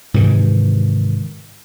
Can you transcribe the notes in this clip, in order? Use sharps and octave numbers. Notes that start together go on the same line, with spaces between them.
G#2 C3 D#3 E3